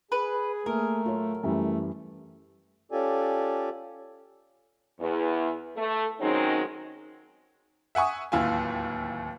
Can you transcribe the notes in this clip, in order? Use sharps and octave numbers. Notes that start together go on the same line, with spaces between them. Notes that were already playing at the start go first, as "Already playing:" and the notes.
G#4 B4
A3 A#3 A#4
A2 F#3 F4 C#5
F#2 E3 G3 A3
C#4 F4 G4 A4 D5 G#5
E2
A3
D#3 F#3 G#3 C4 C#4 D#4
E5 F#5 G#5 C#6 D#6
D1 D#2 E4 F4 G#5